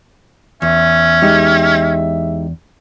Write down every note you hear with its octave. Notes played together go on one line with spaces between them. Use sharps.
E2 C#4 E5
G#3 D#4 G4